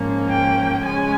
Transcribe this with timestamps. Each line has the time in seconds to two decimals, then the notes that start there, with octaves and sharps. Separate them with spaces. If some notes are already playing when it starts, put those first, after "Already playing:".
Already playing: G#2 F3 A#3 C#4
0.29 G5
0.84 C#3 F3 G#3 C#4 G#5